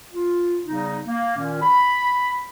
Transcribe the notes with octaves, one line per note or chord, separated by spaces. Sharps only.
F4
C#3 G3 B3 D#4
A#3
A#2 D#3 C#4
B5